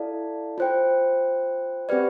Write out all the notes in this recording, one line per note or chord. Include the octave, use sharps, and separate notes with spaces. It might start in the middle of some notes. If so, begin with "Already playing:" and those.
Already playing: E4 A4 D5 F5 A5
F4 C5 G5
C4 G4 B4 D5